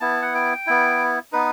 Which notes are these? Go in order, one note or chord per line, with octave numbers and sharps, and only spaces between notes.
B3 E4 A5
F#5
G5
B3 E4
B3 D#4 B4